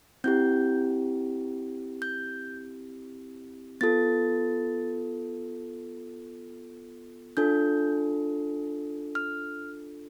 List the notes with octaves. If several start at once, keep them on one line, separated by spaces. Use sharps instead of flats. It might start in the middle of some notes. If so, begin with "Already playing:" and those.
C4 E4 G4 G6
G6
B3 F4 A4 A6
D4 F4 A4 G6
F6